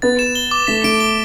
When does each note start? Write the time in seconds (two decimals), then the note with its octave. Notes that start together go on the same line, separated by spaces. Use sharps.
0.02 B3 A6
0.19 E7
0.35 G7
0.51 D6
0.67 A3 B6
0.84 A3 D7
1.00 G7